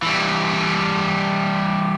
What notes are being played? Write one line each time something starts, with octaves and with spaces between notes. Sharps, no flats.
E3 G3